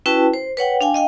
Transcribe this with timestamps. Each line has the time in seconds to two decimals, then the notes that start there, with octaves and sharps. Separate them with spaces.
0.06 C#4 E4 F#4 B4 G5 A5
0.34 C5
0.57 B4 C#5 F#5 G5
0.81 D4 F5 G5 G#5
0.94 D#5 F5 G5